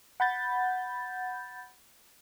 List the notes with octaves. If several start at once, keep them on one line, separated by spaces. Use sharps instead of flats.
F#5 B5 G6 A6